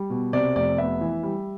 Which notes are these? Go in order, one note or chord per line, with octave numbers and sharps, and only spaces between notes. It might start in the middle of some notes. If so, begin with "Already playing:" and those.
Already playing: G3
B2
C3 D5
F1 D5
B3 E5
E3
G3